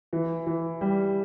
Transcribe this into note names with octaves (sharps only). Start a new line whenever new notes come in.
E3
E3
G3